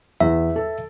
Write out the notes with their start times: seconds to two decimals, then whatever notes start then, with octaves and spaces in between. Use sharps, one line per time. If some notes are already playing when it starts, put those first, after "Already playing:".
0.21 E2 E5
0.56 A4